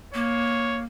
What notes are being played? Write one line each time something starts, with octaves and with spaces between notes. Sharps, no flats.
A#3 C#5